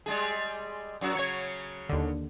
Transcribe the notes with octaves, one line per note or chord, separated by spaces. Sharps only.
G3 G#3 G#4
F#2 F#3 F#4
C#3 F#3 C#5 G#6 C#7
D#2 D3